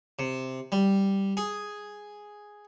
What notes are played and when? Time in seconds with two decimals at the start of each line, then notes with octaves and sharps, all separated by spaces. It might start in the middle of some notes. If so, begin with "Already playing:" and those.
0.19 C3
0.72 G3
1.37 G#4